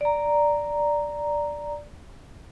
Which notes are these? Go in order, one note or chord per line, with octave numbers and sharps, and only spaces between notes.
D5 A#5